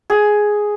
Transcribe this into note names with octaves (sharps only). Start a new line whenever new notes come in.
G#4